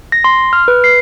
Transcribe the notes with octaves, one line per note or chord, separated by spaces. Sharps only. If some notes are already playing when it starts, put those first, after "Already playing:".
A#6
C6
F6
B4
C7